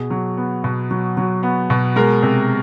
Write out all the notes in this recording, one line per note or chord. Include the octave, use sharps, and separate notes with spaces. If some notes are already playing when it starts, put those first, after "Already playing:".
Already playing: B2 G#4
F#3
B3
B2
F#3
F#3
B3
B2
G#3 A#4
C3